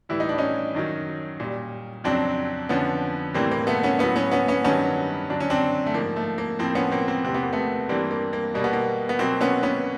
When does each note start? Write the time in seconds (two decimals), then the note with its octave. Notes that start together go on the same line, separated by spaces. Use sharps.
0.09 A2 E3 G3 E4
0.20 D#4
0.29 D4
0.38 C#4 D#4
0.75 F#2 D#3 F#3
1.40 A#2 G3
2.04 F2 C#3 F#3 C4 D4
2.69 F2 D3 F3 B3 C#4
3.34 A2 E3 G3 A#3 C4
3.51 A#3
3.67 A3 B3
3.83 B3 C#4
3.99 A2 F#3 B3 C#4
4.16 B3 C#4
4.32 B3 C#4
4.48 B3 C#4
4.64 G2 D#3 F#3 B3 C#4
5.30 F#2 D3 F#3 D4
5.40 C#4
5.50 C4 D4
5.86 A3
5.94 G#2 F3 A#3
6.16 A3
6.38 A#3
6.59 A2 F3 A#3 C4
6.75 B3 C#4
6.92 A#3 C4
7.08 A#3 C4
7.24 E2 C3 E3 C4
7.34 B3
7.43 A#3
7.53 A3 B3
7.89 G2 E3 G3 A#3 C4
8.11 A#3
8.33 A#3
8.54 B2 G3 A#3
8.64 B3
8.73 A#3
9.09 B3
9.19 B2 F#3 A#3 C4
9.41 B3 C#4
9.63 B3 C#4